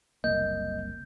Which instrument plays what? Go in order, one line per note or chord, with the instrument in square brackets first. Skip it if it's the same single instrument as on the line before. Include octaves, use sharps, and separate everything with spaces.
[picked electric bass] F#1 C2 A#3 [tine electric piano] D#5 [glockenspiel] G6